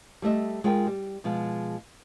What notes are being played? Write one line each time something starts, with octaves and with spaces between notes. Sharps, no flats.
G3 A3 D#5 E5
G#3 F4 G#4 A#4 G5
G3
B2 F3 G#3